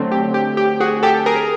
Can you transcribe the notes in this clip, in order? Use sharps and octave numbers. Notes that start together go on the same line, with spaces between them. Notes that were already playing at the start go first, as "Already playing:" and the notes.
Already playing: D3 F#3 A3 C4
G4
G4
G4
F#4 G#4
G4 A4
G#4 A#4